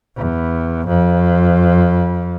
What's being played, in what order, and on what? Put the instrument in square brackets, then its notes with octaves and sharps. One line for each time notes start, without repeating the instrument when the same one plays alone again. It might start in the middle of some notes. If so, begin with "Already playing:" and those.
[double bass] E2
F2